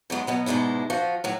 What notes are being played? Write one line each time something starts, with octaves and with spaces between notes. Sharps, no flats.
G#2 F#3 G#3 B3
B2 F#3 B3
G#2 B2 G#3 D4 E4
F3 F#4
A2 F#3